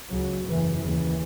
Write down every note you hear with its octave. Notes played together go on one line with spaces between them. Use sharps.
C#2 C#3 F#3
F#1 E2 C#3 E3
D#2 C#3 E3